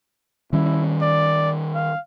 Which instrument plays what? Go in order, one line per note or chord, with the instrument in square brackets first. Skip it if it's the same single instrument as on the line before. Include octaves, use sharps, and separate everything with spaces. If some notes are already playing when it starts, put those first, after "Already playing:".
[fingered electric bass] D#3 G3 C#4 [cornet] E4
[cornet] D5
F5